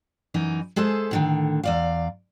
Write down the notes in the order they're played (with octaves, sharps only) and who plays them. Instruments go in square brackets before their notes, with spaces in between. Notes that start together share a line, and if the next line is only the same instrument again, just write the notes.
[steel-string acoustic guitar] F#2 E3 D#4
G#3 G#4 A4 C5 E5
A2 D3 D#3
E2 D5 F5